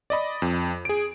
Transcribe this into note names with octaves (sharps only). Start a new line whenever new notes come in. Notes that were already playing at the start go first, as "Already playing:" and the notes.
D5 D#5 B5
F2
G#4 D7